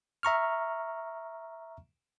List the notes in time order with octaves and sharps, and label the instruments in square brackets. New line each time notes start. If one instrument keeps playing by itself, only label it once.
[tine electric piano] E5 A#5 C#6 F6